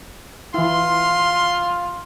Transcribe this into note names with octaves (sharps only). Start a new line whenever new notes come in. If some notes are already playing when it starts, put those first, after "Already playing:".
E3 E4 F4 C6